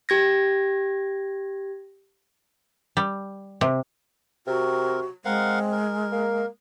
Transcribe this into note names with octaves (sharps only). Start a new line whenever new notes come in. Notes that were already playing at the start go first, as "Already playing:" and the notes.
G4 G#6 A#6
G3
C3
C3 C4 F#4 A#4
G#3 C4 A#4 F5 F#5
A#4
A#3